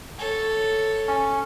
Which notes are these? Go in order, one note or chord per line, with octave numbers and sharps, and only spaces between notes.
A4 C#5
C#4